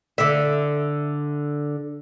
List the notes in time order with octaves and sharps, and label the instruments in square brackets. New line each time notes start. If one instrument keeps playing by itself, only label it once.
[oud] D3 E5